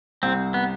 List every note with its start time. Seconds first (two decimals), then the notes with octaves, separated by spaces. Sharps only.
0.23 C2 C4
0.54 B3